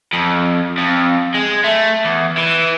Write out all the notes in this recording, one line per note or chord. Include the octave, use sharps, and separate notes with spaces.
F2
F2
G#3
A3
E2
E3